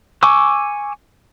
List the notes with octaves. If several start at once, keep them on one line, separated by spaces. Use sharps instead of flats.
G#5 C#6 D6 E6